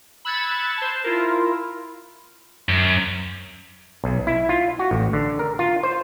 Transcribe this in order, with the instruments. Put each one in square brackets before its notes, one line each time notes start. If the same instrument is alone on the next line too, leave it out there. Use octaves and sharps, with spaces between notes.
[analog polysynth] B5 E6 F#6 G#6 A6 C#7
C5 A5
E4 F4 A#4
[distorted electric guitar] F#2
[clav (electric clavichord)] B1
E4
F4
F#4
A1
D3
A#4
F4
C5